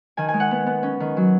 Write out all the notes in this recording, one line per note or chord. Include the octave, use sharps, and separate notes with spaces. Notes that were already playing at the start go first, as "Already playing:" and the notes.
D#3 G#5
G#5
G#3
F#5
B3
B3
C#4
D#3
F#3